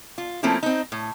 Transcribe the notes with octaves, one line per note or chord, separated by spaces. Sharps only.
F4
F3 A3 A#3 C4 C#4 E4
C4 D#4
A2